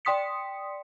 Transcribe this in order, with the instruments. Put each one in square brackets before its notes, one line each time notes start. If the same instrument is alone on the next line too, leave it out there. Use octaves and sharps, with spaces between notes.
[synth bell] D5 G5 C6 D#6 B6 C#7